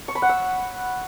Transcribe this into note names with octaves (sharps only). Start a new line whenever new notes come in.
C#6
B5
F#5
E6